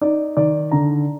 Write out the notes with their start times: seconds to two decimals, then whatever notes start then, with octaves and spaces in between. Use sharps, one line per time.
0.01 D#4 D5
0.37 D#3 D5
0.71 D3 A#5